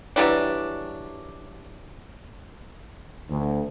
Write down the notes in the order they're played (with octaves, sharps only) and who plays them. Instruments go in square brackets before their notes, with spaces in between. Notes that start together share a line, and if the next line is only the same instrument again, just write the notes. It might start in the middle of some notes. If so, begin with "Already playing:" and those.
[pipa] E3 F#3 G3 D4
[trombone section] D2